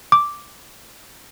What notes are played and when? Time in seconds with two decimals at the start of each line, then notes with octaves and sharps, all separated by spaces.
0.12 D6